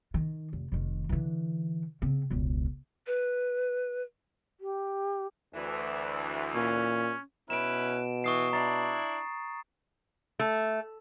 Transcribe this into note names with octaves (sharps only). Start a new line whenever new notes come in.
D#3
F1
F1 D#3
D3 E3
C#3 C4
E1 C#2
B4
G4
D2 E3
A#2 C#4
B2 C#4 E4 B4 D7 E7
E3 C#6 D#6 C7
D4 E4 A#5 A6 C7
A3